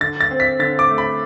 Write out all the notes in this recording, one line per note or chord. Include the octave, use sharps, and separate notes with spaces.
D3 A6
A6
C4
B6
D3 A6
D6
A3
B5